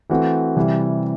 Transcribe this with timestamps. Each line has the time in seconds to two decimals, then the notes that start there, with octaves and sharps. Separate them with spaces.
0.10 E3 A3 C4 F#4
0.56 C3 E3 G3